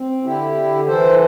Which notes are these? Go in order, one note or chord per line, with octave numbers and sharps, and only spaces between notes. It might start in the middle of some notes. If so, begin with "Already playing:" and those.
Already playing: C4
D3 E4 G4
D3
E3 A4 C5